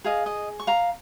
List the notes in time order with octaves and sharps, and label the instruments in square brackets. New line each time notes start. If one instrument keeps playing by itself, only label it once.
[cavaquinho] G#4 D#5 F5
D#5
C#6
F5 A#5